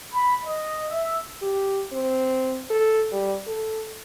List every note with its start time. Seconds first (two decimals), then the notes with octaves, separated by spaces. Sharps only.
0.14 B5
0.45 D#5
0.90 E5
1.42 G4
1.93 C4
2.71 A4
3.12 G3
3.47 A4